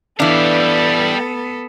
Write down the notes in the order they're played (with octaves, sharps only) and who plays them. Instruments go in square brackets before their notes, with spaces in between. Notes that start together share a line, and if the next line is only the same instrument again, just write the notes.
[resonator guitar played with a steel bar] E3 D4 [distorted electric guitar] G3 F5 [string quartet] B3 A4